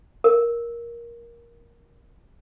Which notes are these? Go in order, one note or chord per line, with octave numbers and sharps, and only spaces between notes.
A#4